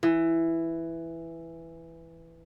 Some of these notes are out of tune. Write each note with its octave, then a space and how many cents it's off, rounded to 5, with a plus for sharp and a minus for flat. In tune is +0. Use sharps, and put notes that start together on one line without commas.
E3 +5